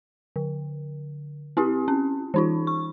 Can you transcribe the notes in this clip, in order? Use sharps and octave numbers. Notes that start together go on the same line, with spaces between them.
D3
C4 E4 G4
C#4
E3 D#4 F4
C#6